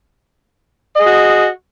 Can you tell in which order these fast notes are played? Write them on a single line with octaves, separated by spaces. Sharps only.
D#5 G#4 F#4